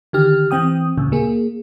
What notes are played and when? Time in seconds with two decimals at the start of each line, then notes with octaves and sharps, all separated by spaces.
0.13 D3 D#3 G4 F6
0.51 E3 C4 G5 D#6
0.97 D2 A#2 C#3
1.12 A#3 G#4